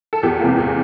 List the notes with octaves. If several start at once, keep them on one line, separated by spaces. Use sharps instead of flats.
A4
E2 G4
C3 E3 A#3
E2